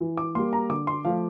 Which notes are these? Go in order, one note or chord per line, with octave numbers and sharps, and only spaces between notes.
E3
D6
G3 A#3 C6
A#5
D3 D6
C6
F3 A3 F5